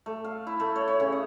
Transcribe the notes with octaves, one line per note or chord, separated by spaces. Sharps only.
A3
F5
E4
A3
C#5
C#5
C#3
D#5